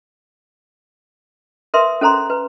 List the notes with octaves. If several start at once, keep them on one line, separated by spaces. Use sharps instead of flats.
A#4 B4 E5 C6 D#6
C#4 A4 C5 A#5 C6
B4